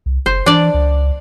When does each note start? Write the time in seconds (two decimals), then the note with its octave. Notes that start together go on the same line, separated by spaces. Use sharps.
0.06 C2
0.26 F#1 C5
0.46 E3 D4 D5
0.74 C#2